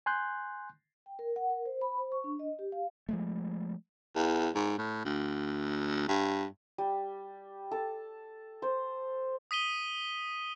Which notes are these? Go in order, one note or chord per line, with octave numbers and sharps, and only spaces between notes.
G#5 C6 F#6 G6
G5
A#4
F#5
A#4
C5
B5
C5
C#6
D4
D#5
G4
F5
F3 G#3 A3
E2
G#2
A2
D2
G2
G3
A4
C5
D#6 B6 D#7 G7